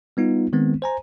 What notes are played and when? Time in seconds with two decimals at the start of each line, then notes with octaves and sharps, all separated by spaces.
0.17 G3 B3 D#4 F4
0.53 D#3 G#3 B3 C4
0.82 C5 G#5 A#5